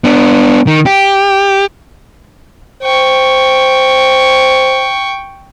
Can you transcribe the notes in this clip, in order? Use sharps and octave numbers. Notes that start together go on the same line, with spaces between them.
B3 D4
D#3
G4
C5 G5 C#6